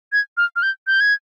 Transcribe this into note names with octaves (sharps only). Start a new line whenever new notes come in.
G#6
F6
F6
G6
G6
G#6